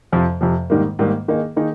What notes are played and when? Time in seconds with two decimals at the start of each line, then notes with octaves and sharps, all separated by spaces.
0.12 F2 C3 F3
0.41 F2 C3 F3
0.70 G#2 D#3 G3 A#3
0.99 G#2 D#3 G3 A#3
1.28 D#3 A#3 D#4 G#4
1.56 D#3 A#3 D#4 G#4